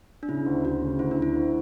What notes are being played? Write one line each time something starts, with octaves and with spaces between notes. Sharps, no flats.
D4
C#3 E4
D2
D2 F#4
C#3
D2 E4
D4
D2
E4
D2